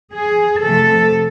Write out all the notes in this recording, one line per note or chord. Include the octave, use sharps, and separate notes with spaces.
G#4
C3 F3 A3 A4